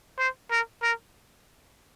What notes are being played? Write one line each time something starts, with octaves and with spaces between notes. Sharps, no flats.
C5
A#4
A#4